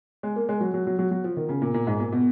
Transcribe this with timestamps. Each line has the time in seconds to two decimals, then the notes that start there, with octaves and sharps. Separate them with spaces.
0.23 G#3
0.36 A#3
0.49 G#3
0.61 F#3
0.74 F#3
0.87 F#3
0.99 F#3
1.11 F#3
1.24 F3
1.37 D#3
1.49 C#3
1.62 A#2
1.74 A#2
1.87 G#2
2.00 A#2
2.12 B2